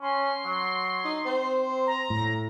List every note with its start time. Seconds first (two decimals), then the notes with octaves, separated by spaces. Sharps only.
0.02 C#4 C6
0.45 F#3
1.04 D#4
1.26 C4 C5
1.87 A#5
2.10 A2